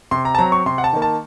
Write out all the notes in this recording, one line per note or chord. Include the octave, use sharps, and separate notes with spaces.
C3 C6
A#5
A5
F#3 C4 A#5
C#6
C3 C6
F#5
A5
D#3 A#3
A5